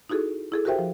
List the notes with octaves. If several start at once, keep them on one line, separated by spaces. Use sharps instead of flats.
D#4 E4 F#4 G#4 A4
E4 G#4 A4
F#4 G4 A#4 C5 E5 G5
F3